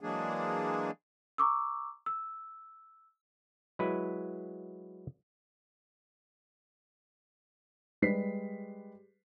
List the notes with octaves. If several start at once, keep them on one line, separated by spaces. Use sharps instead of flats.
E3 F#3 G#3 A#3 D4 G#4
A#5 C#6 D6 E6
E6
F#3 G#3 E4 B4
G3 G#3 B4 B6 C7